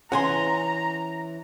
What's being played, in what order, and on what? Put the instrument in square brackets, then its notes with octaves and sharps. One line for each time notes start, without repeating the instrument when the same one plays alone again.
[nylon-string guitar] E3 C#4 [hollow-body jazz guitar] F#5 G#5 C6 [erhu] A#5